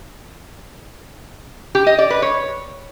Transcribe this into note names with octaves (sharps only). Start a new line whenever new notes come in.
G4
D#5
D5
B4
C#5